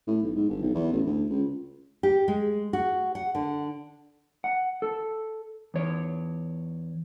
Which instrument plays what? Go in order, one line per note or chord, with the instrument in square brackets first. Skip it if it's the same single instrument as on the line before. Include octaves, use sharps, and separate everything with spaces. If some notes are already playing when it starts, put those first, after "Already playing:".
[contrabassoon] A2
B1
G#2
G1
B1
E2
A1
D2
C#2
[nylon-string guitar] G4
G#3
F#4
F#5
D3
[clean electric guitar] F#5
A4
E2 C#5